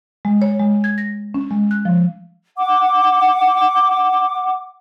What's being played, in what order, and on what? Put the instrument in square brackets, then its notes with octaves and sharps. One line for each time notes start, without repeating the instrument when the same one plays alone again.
[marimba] G#3
C#5
G#3
G#6
A#6
C#4
G#3
F#6
F3
[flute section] F#5 D6